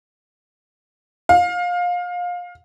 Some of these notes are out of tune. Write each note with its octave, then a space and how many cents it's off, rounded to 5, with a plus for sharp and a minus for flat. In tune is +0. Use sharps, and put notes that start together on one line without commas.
F5 +25